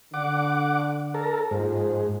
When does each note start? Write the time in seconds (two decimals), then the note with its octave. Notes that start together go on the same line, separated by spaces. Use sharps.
0.14 D3 F#5 D6
1.14 A4 A#4
1.51 G#2 F3 A#3 C5